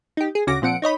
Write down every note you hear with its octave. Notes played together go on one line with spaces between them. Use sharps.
D#4 G4
G#4
D2 C#3 C#4 F#4 D6 A#6
A#2 F3 C4 F#5 C#7 D7
D#4 C#5 D#5 B5